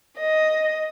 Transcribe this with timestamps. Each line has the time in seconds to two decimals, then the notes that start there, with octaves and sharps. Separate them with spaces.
0.18 D#5